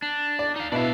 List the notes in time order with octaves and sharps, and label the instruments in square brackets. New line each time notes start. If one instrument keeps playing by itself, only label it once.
[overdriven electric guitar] D4
[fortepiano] D5
[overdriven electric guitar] D#4 F5
[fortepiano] B2 E4 [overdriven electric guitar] D4 F5